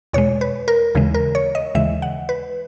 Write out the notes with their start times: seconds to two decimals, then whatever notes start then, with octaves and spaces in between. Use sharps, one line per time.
0.13 E2 B2 G#3 C#5
0.41 B4
0.68 A#4
0.95 D#2 C#3 E3 G#3
1.14 A#4
1.35 C#5
1.55 D#5
1.75 D#2 C#3 E3 G#3 E5
2.02 F#5
2.29 B4